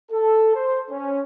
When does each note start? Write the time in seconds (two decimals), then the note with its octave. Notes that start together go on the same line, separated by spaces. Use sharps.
0.12 A4
0.55 C5
0.90 C#4